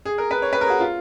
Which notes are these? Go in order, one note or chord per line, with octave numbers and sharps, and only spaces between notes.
G#4
A#4
B4
C#5
B4
A#4
G#4
F#4
F4